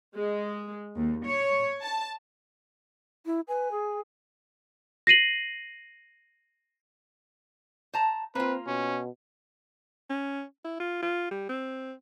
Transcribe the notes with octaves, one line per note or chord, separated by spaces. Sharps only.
G#3
D#2
C#5
A5
E4
B4 G#5
G#4
A#6 C7 D#7 F#7
C5 A5 A#5
A#3 C4 F4 B4
B2 C#4
C#4
E4
F4
F4
G3
C4